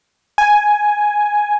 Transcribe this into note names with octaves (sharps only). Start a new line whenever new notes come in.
G#5